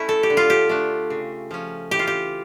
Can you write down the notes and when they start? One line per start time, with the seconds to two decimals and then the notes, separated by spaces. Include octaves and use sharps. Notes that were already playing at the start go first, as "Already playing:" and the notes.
Already playing: A3 C#4 E4
0.09 A4
0.23 G4
0.30 D3
0.37 F4
0.50 G4
0.69 A3 D4
1.10 C#3
1.51 F3 C#4
1.91 E3 G4
1.99 F4
2.07 G4